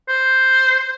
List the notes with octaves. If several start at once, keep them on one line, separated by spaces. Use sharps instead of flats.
C5